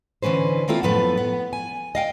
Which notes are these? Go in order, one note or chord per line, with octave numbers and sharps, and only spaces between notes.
D3 E3 C#4 B4 C5
D#3 A#3 C4 E4 F4 A4
F#2 A2 F3 B3 A4 B4
B3
G#5
D#5 F5 G5